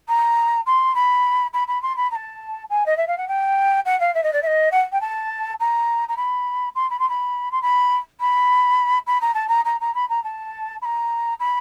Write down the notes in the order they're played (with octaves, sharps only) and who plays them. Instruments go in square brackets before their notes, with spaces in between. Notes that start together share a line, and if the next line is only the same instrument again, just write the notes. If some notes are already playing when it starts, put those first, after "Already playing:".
[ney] A#5
C6
B5
B5
B5
C6
B5
A#5
A5
G#5
D#5
E5
F5
F#5
G5
F#5
F5
E5
D#5
D5
E5
D#5
F#5
G5
A5
A#5
A#5
B5
C6
B5
C6
B5
C6
B5
B5
B5
A#5
A5
A#5
A#5
A#5
B5
A#5
A5
B5
A#5
B5